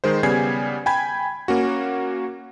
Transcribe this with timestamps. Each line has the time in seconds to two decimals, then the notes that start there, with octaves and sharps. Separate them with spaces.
0.04 D#3 G#3 C5
0.23 C#3 G3 B3 G#5 G#6 C7
0.86 G5 G#5 B5 G#6
1.48 A#3 C#4 F#4